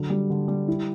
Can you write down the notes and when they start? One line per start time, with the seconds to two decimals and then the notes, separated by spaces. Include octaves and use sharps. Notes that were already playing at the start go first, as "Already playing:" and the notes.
Already playing: D3 F#3
0.10 G3
0.30 D3
0.48 G3
0.68 E4